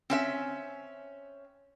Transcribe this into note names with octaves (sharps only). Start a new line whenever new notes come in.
C4 C#4 E5